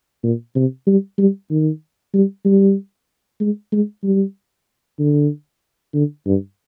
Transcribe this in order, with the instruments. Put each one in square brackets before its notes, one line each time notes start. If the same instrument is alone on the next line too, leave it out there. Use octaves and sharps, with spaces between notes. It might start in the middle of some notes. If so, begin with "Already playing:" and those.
[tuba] A#2
C3
G3
G3
D#3
G3
G3
G#3
G#3
G3
D3
D3
G2